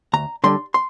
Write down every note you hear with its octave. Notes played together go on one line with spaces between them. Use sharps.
D2 A#5
D3 G3 D4 C6
C6